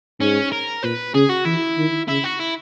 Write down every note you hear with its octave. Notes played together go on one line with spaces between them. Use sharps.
G#2 C#4
A#4
A#2 B4
C#3 G#4
F#4
E3 E4
D#3
C#3 E4
F#4
E4